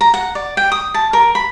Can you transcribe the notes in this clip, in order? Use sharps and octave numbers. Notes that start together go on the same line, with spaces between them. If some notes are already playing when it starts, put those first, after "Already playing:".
A#5
F#5
D5
G5
D#6
A5
A#4
B5